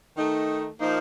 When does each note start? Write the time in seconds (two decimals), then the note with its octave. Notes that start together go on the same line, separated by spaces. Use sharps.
0.16 D#3 A3 D#4
0.80 A#2 F3 A#3 D#4